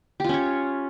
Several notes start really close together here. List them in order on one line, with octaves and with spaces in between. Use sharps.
G4 F4 C#4 C#5